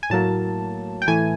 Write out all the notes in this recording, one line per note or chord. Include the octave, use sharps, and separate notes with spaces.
G#5
A2 F#3 A#3 A5
G5
A2 E3 A3 G#5